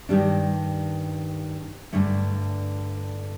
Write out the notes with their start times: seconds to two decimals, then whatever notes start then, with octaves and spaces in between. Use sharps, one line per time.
0.09 G2 D#3 G3 D4
1.93 G2 D3 A3